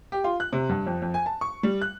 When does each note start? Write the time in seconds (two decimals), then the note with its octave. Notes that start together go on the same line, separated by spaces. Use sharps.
0.12 G4
0.24 F4
0.40 F#6
0.53 C3
0.69 G2
0.86 F2
1.02 F2
1.14 G#5
1.26 A5
1.41 C#6
1.63 G3
1.81 F#6